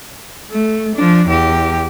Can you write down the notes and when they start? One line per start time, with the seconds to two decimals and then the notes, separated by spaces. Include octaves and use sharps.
0.51 A3
0.96 F3 D4
1.28 E2 G4